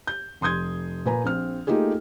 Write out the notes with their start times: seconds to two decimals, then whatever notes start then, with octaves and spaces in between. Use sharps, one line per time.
0.07 G6
0.41 F1 C6 D#6 G6 G#6
1.06 A#2 B4 G#5 A#5
1.24 A#1 C4 F6
1.67 A3 A#3 D#4 F4 G4 G#4